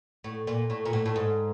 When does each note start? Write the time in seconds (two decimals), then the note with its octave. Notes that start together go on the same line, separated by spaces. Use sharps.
0.24 A2
0.47 A#2
0.70 A2
0.85 A#2
0.93 A2
1.06 A2
1.16 G#2